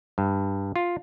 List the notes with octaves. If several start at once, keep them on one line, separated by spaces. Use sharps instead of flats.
G2
F4